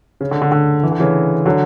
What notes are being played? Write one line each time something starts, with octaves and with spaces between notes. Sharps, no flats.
C#3
D3
D3
D3
E3
D3
C#3 E3
D3 F#3